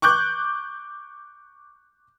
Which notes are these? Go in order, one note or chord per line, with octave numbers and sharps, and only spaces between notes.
C#6 D6 F#6 G6